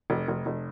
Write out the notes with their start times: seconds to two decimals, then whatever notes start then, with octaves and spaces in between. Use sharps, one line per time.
0.10 F1
0.28 F1
0.46 F1